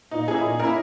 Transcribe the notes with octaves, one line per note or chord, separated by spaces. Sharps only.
A#2 D#4
A#3 C#4 E4 G#4
A#2
A#3 C#4 E4 A#4